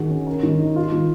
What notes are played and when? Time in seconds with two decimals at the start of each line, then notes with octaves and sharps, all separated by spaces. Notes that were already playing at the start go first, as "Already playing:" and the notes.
Already playing: D#3 F#4 G#4
0.10 C#4
0.27 A#4
0.43 D#3
0.60 D#4
0.76 F4
0.92 D#3